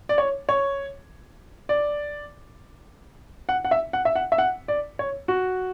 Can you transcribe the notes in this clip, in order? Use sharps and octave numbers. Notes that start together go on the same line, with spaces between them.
D5
C#5
C#5
D5
F#5
F#5
E5
F#5
E5
F#5
E5
F#5
D5
C#5
F#4